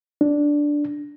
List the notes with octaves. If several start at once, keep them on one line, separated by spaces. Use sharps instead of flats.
D4